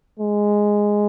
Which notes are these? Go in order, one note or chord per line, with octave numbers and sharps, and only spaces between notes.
G#3